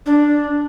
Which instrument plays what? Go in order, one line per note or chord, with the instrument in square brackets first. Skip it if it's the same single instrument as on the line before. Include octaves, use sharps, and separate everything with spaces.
[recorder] D4